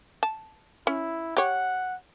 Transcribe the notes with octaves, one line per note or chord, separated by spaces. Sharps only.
A5
C#4 E4
G4 C#5 F#5